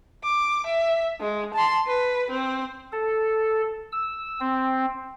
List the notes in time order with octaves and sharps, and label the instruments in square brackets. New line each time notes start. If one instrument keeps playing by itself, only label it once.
[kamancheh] D6
E5
G#3
A5 C6
B4
C4
[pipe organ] A4
E6
C4